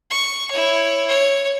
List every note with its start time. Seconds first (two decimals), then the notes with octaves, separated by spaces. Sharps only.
0.11 C#6
0.50 E4 C#5
1.08 C#5